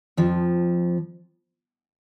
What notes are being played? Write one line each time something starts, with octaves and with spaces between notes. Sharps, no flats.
F2 F3